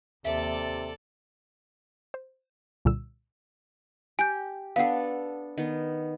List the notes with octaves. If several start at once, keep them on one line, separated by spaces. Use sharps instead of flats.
D#2 C3 A4 D5 E5
C5
C2 A#2 D3 G3 E6
G4 G#5 G6
B3 D4 A4 F5 F#5
D#3 B3